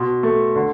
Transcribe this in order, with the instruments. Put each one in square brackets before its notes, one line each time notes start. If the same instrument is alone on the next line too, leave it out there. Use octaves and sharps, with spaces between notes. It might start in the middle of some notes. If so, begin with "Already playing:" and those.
Already playing: [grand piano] B2 C6
A3
D3